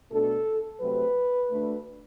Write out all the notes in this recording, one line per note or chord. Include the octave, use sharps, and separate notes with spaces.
B2 A3 D4 A4
C3 F#3 A3 C4 B4
D2 D3 A3